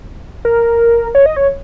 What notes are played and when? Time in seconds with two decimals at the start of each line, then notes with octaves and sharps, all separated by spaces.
0.45 A#4
1.15 C#5
1.26 D#5
1.36 C#5